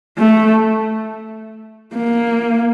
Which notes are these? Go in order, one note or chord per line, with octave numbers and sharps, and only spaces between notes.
A3
A#3